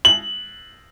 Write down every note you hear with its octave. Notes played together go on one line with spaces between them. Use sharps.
F#7